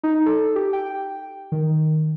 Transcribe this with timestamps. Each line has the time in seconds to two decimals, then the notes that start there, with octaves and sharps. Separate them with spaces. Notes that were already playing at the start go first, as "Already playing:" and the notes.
0.03 D#4
0.26 A4
0.56 G4
0.73 G5
1.52 D#3